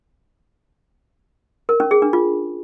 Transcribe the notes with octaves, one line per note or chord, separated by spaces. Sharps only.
A#4
C#4
G#4
D4
F4